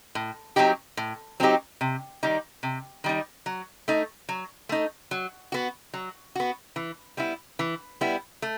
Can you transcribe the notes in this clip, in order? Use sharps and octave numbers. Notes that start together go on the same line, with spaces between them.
A2
F#3 C4 D#4 G4
A2
F#3 C4 D#4 G4
C3
D#3 G3 D#4
C3
D#3 G3 D#4
F#3
A3 D#4
F#3
A3 D#4
F#3
B3 F#4
F#3
B3 F#4
E3
G3 B3 E4
E3
G3 B3 E4
A3